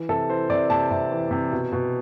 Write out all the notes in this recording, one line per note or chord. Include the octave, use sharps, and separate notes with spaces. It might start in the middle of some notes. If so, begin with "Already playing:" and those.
Already playing: E3
C3 A4
E3 C5
C3 D5
C3 A5
C3
E3
C3
B2
B2